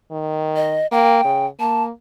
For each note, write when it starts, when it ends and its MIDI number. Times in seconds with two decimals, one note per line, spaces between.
0.11 0.79 51
0.56 0.87 75
0.92 1.19 58
0.92 1.46 79
1.24 1.47 49
1.60 1.90 58
1.60 1.83 81